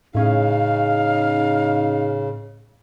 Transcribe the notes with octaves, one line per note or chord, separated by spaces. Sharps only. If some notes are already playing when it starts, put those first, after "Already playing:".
A2 C#3 C#4 D#4 G#4 F5